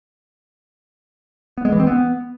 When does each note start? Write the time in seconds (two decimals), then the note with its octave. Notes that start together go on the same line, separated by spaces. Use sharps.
1.58 B3
1.65 G#3
1.72 E3
1.80 C4
1.87 B3